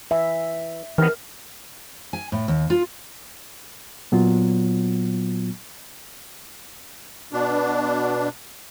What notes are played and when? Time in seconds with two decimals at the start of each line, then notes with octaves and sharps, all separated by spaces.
0.11 E3 E5
0.98 C3 D#3 E3 B3 A#4 F6
2.13 G#5
2.32 A2
2.48 D#2
2.70 F4
4.12 A#2 F#3 B3 F4
7.33 B2 D4